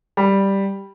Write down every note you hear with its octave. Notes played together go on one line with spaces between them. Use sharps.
G3